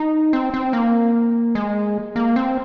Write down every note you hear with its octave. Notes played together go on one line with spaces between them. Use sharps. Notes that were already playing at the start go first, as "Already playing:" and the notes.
Already playing: D#4
C4
C4
A#3
G#3
A#3
C4